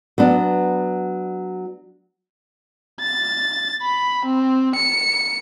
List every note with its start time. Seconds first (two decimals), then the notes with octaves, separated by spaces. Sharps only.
0.18 F#3 B3 D4
3.01 A6
3.82 B5
4.25 C4
4.75 C#7